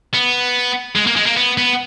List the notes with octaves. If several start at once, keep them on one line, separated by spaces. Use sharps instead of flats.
B3
G#3
A#3
G#3
A#3
B3
B3